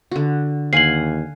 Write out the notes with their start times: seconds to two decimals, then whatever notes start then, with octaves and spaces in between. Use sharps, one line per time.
0.11 D3 F#4
0.73 D#2 F5 F#5 G#5 C7 F#7